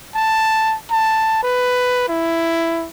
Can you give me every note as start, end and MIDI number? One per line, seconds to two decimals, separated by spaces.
0.15 0.76 81
0.91 1.40 81
1.43 2.04 71
2.09 2.87 64